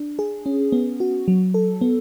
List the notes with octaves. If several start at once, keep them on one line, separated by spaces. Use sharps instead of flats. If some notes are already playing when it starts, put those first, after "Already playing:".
Already playing: D4
G#4
C#4
B3
F#4
F#3
A4
B3